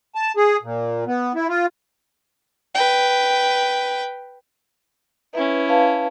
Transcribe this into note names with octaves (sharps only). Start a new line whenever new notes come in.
A5
G#4
A#2
B3
E4
F4
B4 G5
C#4 E4 B4 E5
B4 F5 A5